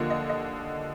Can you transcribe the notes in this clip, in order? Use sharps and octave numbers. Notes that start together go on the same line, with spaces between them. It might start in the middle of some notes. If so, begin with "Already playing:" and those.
Already playing: D#2 D3 F3 A#3 D#5
D#5
D#5